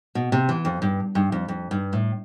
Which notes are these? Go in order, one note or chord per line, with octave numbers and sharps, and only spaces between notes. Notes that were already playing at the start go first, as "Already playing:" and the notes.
B2
C3
E3
F2
G2
G2
F2
F2
G2
A2